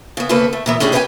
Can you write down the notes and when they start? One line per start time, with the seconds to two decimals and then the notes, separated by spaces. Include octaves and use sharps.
0.17 C#3 B3
0.29 D2 C#3 A#3 A4 B4
0.53 A3
0.66 A#2 E3 B3
0.80 A2 C#4 D4 G4 G#4
0.92 G4 G#4 B4 D#5 G5 G#5